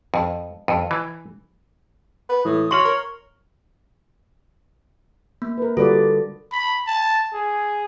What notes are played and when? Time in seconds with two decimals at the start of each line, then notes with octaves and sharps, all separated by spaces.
0.14 F2
0.68 F2
0.91 E3
2.29 B4
2.45 A2 E3 D#6
2.71 F#3 C#5 C6 C#6 F6 F#7
2.85 A#4
5.42 A#3
5.58 A#4 B4
5.77 D3 G3 F4 F#4 A4 B4 D5
6.52 B5
6.87 A5
7.33 G#4